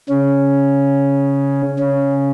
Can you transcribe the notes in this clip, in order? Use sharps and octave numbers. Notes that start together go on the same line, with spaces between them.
C#3 C#4
C#3 C#4